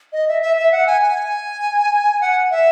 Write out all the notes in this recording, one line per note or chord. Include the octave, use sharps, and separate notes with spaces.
D#5
E5
E5
E5
F#5
G#5
G#5
F#5
E5